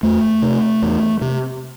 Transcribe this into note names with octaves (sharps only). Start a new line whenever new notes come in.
E2 A3
C3
E2
C3